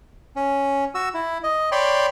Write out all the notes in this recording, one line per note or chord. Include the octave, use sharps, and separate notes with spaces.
C#4
F#4 E6
E4
D#5
C#5 D5 G5 B5 C6